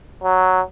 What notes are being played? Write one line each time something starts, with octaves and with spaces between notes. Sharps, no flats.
F#3